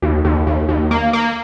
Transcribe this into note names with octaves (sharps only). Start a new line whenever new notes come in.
D#2
D#2
D#2
D#2
A#3
A#3